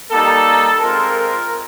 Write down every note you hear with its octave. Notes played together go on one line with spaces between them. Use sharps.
G3 A#3 D#4 A4
G#3 C4 F4 A#4